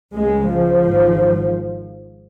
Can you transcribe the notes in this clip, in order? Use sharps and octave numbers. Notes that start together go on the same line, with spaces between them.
C#2 C#3 G#3
F3
G#1 G#2